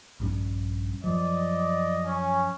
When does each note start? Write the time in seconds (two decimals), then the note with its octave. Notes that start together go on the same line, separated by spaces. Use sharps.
0.20 A#1 G2 C#4
1.04 F#2 F3 D5 D#5
2.06 C#4